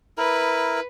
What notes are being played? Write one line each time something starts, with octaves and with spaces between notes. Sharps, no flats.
E4 A#4 B4